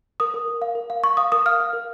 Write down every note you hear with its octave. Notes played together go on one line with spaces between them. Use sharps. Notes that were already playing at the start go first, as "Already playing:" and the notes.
A#4 D#6
A#4
A#4
F5
A#4
F5
F5 C#6
F5 D#6
A#4 D#6
F5 F6
F5
A#4